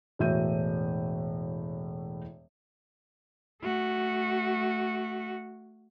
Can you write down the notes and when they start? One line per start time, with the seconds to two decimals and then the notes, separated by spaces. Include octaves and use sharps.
0.19 E1 A2 F#4 E5 G6 D#7
3.62 A3 F#4